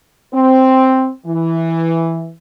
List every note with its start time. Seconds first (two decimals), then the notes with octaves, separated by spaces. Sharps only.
0.34 C4
1.26 E3